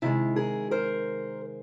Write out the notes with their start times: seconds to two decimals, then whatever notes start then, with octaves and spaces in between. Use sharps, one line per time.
0.02 C3 D#3 G#3 E4
0.36 G#4 A#4
0.71 A#4 C5